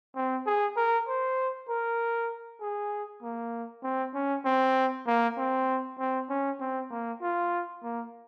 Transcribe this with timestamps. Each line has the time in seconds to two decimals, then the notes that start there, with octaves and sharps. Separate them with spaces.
0.15 C4
0.46 G#4
0.77 A#4
1.07 C5
1.69 A#4
2.61 G#4
3.23 A#3
3.83 C4
4.14 C#4
4.45 C4
5.07 A#3
5.38 C4
5.99 C4
6.29 C#4
6.60 C4
6.91 A#3
7.22 F4
7.83 A#3